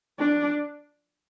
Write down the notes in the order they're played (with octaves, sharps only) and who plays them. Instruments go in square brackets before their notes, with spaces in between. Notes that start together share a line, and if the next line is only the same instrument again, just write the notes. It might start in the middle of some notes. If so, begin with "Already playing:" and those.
[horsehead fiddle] D4